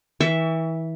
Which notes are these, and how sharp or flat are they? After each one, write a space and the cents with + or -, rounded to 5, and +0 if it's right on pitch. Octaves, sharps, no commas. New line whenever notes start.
E3 -30 E5 +0 C#6 +35